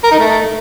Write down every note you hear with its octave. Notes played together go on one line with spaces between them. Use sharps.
A#4
D#4
A3